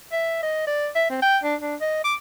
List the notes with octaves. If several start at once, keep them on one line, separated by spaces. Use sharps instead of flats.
E5
D#5
D5
E5
C4
G5
D4
D4
D#5
D6